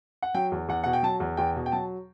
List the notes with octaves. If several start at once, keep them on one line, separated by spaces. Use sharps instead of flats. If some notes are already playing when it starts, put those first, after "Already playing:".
F#5
F#3 G5
E2
E2 F#5
B2 F#5
G5
F#3 A5
E2
E2 G5
B2
G5
F#3 A5